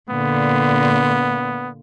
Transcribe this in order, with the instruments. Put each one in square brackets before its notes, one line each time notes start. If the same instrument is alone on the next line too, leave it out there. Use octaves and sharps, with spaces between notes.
[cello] A#2 D3 [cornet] B3